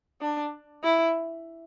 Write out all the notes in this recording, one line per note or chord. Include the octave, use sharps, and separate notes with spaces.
D4
E4